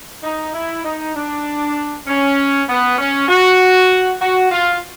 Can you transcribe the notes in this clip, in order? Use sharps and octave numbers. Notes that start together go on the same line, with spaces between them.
D#4
E4
D#4
D4
C#4
B3
C#4
F#4
F#4
F4